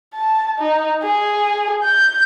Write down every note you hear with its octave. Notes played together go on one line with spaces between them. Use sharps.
A5
D#4
G#4
G6